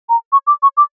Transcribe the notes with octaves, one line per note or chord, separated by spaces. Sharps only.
A#5
C#6
D6
C#6
D6